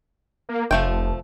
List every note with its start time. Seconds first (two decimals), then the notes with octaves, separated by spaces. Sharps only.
0.49 A#3
0.71 F1 F3 A3 G5